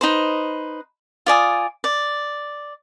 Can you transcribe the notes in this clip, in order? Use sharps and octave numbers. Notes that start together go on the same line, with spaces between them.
D#4 B4 C5
F4 D5 G#5 D#6
D5